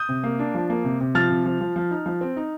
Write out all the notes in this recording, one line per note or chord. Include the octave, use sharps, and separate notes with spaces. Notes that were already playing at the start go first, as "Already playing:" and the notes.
Already playing: D#6 G6
C3
A#3
D4
F3
A#3
C3
C3
F3 F6 A6
C3
F3
F3
F3
D#4
F3
C4
D#4